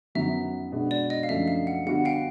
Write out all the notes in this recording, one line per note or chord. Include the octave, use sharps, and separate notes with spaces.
F#2 D#3 F#3 B3 E5
B2 G#3 B3 D4 F#4
D5
D#5
F5
F#2 C#3 F3 A3 D4 E5
F5
F#5
D3 G3 B3 D4 F#4 F#5
F5 G5